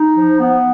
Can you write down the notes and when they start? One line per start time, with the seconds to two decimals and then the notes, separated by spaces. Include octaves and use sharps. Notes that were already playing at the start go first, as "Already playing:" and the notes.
Already playing: D#4
0.16 F3
0.39 B3